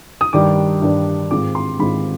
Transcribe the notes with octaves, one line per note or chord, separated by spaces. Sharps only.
D#6
G2 D#3 G3 D4 D6
G2 D#3 G3 D4
G#2 D#3 G#3 C4 F4 D6
C6
G#2 D#3 G#3 C4 F4 B5